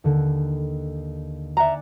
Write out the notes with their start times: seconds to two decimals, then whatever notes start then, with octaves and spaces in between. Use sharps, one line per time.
0.04 D#2 D3
1.57 D5 E5 F#5 G#5 A#5